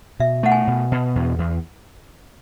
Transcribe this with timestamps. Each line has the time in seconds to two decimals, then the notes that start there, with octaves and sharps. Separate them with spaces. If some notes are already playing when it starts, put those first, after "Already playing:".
0.20 B2 E5
0.43 A3 F#5
0.52 G#5
0.67 B2
0.92 B2
1.15 E2
1.38 E2